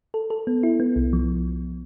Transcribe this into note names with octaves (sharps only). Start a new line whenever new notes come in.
A4
A4
B3
E4
B3
C2
F3